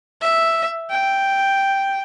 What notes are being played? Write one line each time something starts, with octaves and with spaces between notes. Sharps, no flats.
E5
G5